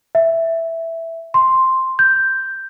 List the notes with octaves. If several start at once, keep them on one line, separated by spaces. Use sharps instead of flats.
E5
C6
G6